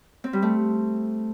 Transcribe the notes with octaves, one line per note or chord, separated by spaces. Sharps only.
C4
G3
A3